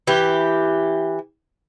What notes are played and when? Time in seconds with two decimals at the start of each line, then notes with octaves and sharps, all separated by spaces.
0.07 E3 G4